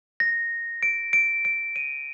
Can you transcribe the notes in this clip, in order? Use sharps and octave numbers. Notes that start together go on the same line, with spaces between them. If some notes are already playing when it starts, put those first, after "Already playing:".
A#6
D7
D7
D7
D#7